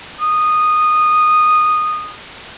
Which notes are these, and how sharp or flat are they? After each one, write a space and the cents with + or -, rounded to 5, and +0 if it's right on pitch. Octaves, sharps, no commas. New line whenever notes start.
D#6 -15